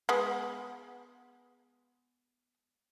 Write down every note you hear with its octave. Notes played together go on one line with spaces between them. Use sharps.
G#3 B3